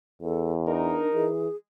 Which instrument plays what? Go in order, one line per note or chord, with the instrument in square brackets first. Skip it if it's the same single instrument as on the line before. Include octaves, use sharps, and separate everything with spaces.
[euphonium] E2 [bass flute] A4
[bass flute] D4 [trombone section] D#4 A#4
[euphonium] E3 [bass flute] G#4